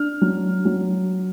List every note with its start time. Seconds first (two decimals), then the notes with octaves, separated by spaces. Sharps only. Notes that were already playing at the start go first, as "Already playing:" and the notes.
Already playing: D4 F6
0.21 F#3
0.65 F#3